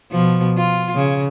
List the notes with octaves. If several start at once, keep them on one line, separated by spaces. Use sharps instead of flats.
B2 F3
F4
C#3